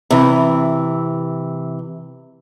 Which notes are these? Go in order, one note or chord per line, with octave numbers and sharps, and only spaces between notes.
C3 E3